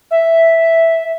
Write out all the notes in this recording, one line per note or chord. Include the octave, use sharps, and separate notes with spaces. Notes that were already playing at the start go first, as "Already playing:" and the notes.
E5